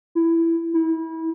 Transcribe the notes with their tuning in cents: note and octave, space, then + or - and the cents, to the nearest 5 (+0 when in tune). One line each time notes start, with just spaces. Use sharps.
E4 +10
E4 -30